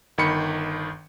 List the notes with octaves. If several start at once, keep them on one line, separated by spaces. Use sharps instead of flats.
G1 D#3 B5 C#7